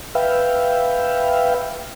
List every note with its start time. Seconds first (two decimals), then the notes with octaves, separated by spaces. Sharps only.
0.15 B4 E5 F5 G5